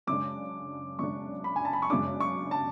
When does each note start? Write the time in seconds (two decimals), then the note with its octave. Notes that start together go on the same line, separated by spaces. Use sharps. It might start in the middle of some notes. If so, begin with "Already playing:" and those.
0.07 F#2 C#3 G#3 D4 D6
0.99 F#2 C#3 G#3 D4 C#6
1.44 B5
1.56 G#5
1.65 A5
1.73 B5
1.82 C#6
1.90 F#2 C#3 G#3 D4 D6
2.20 C#6
2.51 A5